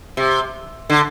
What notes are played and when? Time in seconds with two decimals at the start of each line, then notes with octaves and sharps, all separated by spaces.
0.17 C3
0.90 D3